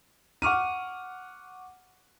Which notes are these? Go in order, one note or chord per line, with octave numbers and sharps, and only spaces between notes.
F#5 C#6 D6 F6 D#7